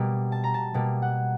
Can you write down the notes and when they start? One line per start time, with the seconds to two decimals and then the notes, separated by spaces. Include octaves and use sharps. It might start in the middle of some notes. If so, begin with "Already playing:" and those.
Already playing: B2 G3 A#3
0.32 A5
0.44 A#5
0.54 A5
0.74 B2 G3 A#3
1.02 F#5